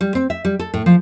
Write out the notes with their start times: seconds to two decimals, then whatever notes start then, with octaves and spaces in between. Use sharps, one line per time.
0.01 G3
0.15 C4
0.30 E5
0.45 G3
0.59 A4
0.74 A2
0.86 F3